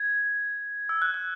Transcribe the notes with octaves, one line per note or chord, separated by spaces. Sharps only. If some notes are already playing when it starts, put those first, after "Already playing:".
Already playing: G#6
E6
F#6
F#6